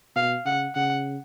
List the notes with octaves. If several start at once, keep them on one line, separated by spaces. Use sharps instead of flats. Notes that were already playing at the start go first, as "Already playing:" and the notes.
B2 F5
C#3 F#5
C#3 F#5